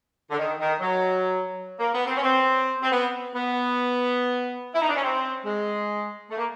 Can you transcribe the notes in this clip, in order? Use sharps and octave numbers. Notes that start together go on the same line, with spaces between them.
D3
D#3
D#3
F#3
A#3
B3
C4
C#4
C4
C4
B3
B3
E4
D#4
D4
C#4
C4
G#3
A3
A#3